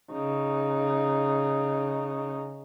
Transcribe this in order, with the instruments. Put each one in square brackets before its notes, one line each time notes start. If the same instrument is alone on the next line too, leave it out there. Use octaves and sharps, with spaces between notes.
[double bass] C#3 D#4